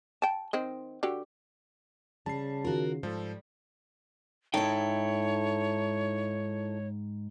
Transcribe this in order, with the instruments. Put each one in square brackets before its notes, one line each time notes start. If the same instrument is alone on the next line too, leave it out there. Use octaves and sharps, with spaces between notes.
[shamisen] G5 A5
D#3 C4 D#5
D3 F#4 G4
[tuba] C#3 [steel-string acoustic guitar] G3 [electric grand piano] A5 C7
[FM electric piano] D#3 F4 [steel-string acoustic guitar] F#4 A#4
[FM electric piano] G#2 [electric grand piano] F3 A4 [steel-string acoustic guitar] G3
[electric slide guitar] G#2 D#4 G5 [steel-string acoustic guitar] E4 A4 [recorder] C#5